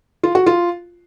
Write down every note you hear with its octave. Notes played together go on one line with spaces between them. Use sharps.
F4
F#4
F4